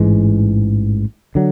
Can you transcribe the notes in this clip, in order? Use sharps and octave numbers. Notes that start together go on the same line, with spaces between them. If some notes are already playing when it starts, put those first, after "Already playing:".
Already playing: A1 G#2 E3 G#3
D3 F#3